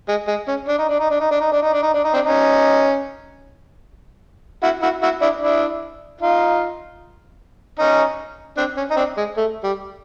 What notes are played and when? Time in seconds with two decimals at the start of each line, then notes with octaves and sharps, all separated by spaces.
0.08 G#3
0.28 G#3
0.48 C#4
0.68 D4
0.78 D#4
0.89 D4
1.00 D#4
1.10 D4
1.20 D#4
1.31 D4
1.40 D#4
1.52 D4
1.62 D#4
1.73 D4
1.83 D#4
1.94 D4
2.04 D#4
2.14 C4 D4
2.25 C#4 D#4
4.63 E4 F#4
4.82 E4 F#4
5.03 E4 F#4
5.22 D4 E4
5.41 D4 E4
6.21 D#4 F4
7.79 C#4 D#4
8.57 C4 D4
8.77 C#4
8.90 D#4
8.97 C4 D4
9.17 G#3
9.37 A3
9.63 G3